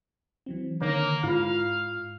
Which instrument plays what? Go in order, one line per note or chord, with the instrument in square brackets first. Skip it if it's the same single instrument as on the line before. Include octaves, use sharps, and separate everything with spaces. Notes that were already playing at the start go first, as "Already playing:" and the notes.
[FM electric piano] E3 F#3 C4
[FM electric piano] D3 D#3 [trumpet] A#3 [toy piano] C#5
[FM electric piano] G#2 [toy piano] E4 F4 [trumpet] F5